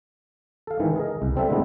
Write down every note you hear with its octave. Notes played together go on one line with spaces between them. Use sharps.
A4 F5
G#2 D#3 E3
G#4 A#4 D#5
C2
G3 C4 A4 E5
A2 D3 G#3 A3 B3 E4